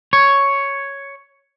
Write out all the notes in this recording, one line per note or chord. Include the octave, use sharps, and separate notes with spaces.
C#5